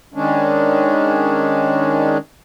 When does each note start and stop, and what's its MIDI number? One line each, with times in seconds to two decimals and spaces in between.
0.14 2.17 51
0.14 2.17 56
0.14 2.17 61
0.14 2.17 62